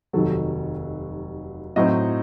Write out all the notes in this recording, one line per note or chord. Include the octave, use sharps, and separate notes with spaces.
F1 D#2 D#3 F#3 A4
A2 F#3 C4 D#4 D#5